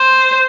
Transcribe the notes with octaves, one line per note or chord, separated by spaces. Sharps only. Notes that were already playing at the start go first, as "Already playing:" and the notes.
Already playing: C5